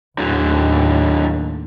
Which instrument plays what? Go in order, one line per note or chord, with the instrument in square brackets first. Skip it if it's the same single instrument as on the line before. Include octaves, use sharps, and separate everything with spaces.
[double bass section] D#2 A2 [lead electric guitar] D3 F#3